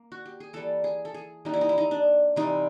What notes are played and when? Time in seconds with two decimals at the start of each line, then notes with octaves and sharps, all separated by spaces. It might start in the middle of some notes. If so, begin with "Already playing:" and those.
Already playing: A#3
0.12 F#4
0.26 G4
0.40 G#4
0.53 E3 G3 A#3 A4
0.84 G#4
1.05 A4
1.14 G#4
1.45 E3 G3 A#3 D#4
1.54 E4
1.61 D#4
1.69 E4
1.78 D#4
1.91 D4
2.36 C3 E3 G3 D#4